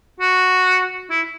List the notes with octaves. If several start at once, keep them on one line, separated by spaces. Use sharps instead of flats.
F#4
E4